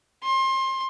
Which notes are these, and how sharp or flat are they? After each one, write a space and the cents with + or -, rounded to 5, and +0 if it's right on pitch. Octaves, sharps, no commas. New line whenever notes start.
C6 +25